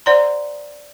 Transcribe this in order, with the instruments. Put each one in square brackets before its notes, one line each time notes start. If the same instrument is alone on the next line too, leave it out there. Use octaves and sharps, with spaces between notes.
[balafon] C5 D5 F#5 A#5 C6